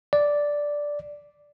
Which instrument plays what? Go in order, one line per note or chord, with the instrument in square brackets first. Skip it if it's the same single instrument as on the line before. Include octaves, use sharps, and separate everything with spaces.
[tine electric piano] D5